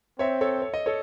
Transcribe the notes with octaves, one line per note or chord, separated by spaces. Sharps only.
C4 C#5 E5
A4 C#5
C#5
D#5
A4 C#5